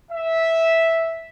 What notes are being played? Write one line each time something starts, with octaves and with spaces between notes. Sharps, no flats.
E5